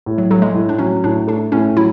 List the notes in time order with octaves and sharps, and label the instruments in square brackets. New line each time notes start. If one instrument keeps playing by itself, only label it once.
[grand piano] A2
[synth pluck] F#3
[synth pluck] F#3 [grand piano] A3
[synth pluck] G#3
[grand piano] A2
[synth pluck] D4
[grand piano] F#3 [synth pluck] C#4
[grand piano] A2 [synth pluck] D4
[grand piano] A3 [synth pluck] D4
[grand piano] A2 [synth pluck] C#4
[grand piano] F#3 [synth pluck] E4